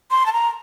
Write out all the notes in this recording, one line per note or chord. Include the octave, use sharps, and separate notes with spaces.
C6
A5
A#5